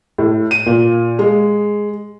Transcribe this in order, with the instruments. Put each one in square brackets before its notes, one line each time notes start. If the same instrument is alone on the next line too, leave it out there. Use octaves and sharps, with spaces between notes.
[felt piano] A2
D#7
A#2
G#3